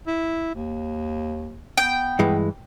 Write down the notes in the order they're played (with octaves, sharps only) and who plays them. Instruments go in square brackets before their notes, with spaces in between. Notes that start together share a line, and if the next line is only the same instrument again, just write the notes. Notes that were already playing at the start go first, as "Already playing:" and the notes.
[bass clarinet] E4
D#2
[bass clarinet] B3 [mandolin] G5
[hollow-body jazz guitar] G2 E3 G#3